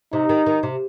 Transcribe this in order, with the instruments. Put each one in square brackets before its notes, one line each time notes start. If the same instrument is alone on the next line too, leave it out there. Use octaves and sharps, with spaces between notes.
[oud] C3 [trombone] D#4
[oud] D#3
D#3
C3